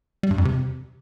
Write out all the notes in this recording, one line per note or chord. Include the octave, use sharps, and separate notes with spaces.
G3
G2
F2
C3